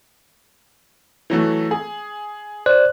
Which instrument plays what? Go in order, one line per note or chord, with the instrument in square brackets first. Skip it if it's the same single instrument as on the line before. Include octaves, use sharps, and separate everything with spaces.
[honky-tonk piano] E3 F#3 A3
G#4
[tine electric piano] C5 D5 F#6